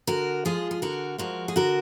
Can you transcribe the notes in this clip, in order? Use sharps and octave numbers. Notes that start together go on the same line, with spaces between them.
D3 F#4 A#4
F3 G#3 F4 G#4
G#4
D3 F#4 A#4
F3 G#3 F#4 A#4
G#4
D3 F#4 A#4